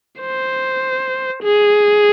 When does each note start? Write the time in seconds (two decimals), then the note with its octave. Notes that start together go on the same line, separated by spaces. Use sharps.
0.20 C5
1.43 G#4